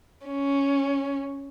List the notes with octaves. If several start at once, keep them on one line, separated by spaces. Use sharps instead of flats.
C#4